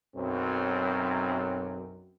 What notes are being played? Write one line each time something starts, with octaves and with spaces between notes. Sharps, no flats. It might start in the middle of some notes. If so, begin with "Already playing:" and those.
B1 F#2 C4